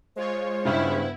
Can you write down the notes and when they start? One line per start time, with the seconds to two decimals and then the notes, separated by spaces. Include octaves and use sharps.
0.16 G#3 F4 C5 C#5
0.65 G2 C#3 B3 E4